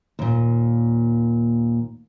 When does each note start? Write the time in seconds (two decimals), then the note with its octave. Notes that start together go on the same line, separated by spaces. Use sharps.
0.19 D#2 A#2